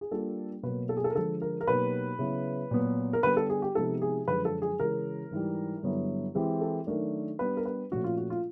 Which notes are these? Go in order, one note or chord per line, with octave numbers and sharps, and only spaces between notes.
G#4
G3 A#3 D4 F4 A4
B2 F#3 A#3 B4
A4
G#4
A4
A#4
D3 F3 G#3 A4
A#4
A#4
B2 F#3 A#3 D#4 G4 B4
C#3 F#3 B3 E4
A#2 F#3 B3
A#4
D3 G3 B3 B4
A4
G#4
G4
C3 F3 G#3 B3 D#4 A4
G#4
F#2 D3 F3 G#3 B4
A4
G#4
C#3 E3 G#3 C#4 A#4
G#2 E3 G3
G2 D3 F#3 B3 E4
E3 G#3 C4 E4 G4
A4
D#3 F#3 A3 D4 A#4
G3 B3 D4 B4
A#4
B4
A#2 F3 A3 C#4 F#4
F4
F#4
F4